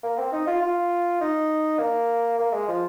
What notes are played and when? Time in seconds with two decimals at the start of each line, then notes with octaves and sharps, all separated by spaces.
0.03 A#3
0.18 C4
0.33 D#4
0.47 F4
0.62 F4
1.21 D#4
1.79 A#3
2.38 A#3
2.53 G#3
2.68 F3